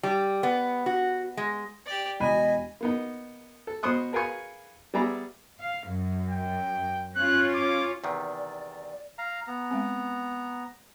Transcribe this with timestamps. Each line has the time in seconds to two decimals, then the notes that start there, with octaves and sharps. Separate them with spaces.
0.03 G3
0.43 B3
0.86 F#4
1.37 G#3
1.86 G4 D5
2.20 E1 D#5 G#5 B5 D#7
2.81 A#3 B3 D#4
3.67 A4
3.83 B2 C5 C6 C#6 D#6 F#6
4.13 G#4 A#4 B4 F5 G#5 C#6
4.94 G3 B3 G#4 D5 E5 A#5
5.59 F5
5.88 F#2
6.30 G5
7.16 C#4 F4 F#6
7.55 D6
8.04 E2 C3 D#3 D5
9.18 F5 A#5
9.47 B3 A#5
9.71 G#3 C4